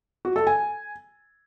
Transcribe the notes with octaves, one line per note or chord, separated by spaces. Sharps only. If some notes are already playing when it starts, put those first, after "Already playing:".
F#4
A4
G#5